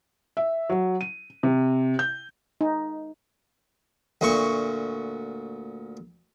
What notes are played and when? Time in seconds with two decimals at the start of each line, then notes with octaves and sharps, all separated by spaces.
0.37 E5
0.70 F#3
1.01 D#7
1.43 C3
1.99 G6
2.61 D#4
4.21 D2 A#2 C#6